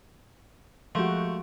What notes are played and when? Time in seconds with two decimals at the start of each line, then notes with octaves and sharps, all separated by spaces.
0.95 F3 G#3 A3 F#4 G4